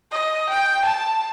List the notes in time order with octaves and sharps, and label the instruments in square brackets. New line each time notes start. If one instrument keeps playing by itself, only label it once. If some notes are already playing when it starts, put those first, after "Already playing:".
[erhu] D#5
G5
A5